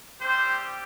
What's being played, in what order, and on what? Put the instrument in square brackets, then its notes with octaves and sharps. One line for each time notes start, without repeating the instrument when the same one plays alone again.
[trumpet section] G3 C4 G4 C5